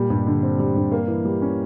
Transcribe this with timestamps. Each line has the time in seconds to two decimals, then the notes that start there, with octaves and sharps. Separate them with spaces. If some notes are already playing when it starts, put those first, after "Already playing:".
Already playing: A#2 G3
0.10 G2
0.27 D3
0.43 C4
0.59 G3
0.76 G2
0.92 A#3
1.08 E3
1.25 G3
1.42 C#4